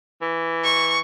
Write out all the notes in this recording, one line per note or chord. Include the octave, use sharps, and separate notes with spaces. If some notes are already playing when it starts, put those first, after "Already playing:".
E3
C#6